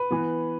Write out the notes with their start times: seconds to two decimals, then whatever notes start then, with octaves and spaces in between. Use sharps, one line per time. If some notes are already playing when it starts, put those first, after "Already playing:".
Already playing: B4
0.11 E3 B3